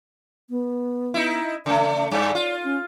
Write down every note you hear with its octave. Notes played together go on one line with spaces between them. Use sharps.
B3
D#4 E4
C#3 A3 D5
G2 D5
F4
C#4